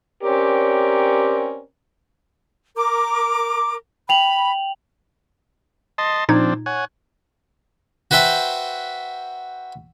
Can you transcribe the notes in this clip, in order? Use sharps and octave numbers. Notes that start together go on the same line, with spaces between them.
C4 C#4 G4 A#4 C#5 D5
A#4 D6
G5 B5 F7 F#7
D#5 A5 C6
A#2 F3 C4 D4 D#4 G#6
C#5 F#5 G#5
F#4 B4 C5 E5 G5 A5